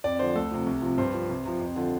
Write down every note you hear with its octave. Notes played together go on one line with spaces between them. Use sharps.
F2 D5
D3 F3 C5
D2 A4
C3 F3
C2
C3 F3
G2 C5
F3
C2
C3 F3
F2
D3 F3